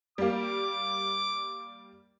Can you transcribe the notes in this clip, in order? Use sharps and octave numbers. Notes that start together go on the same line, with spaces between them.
G3 A#3 D6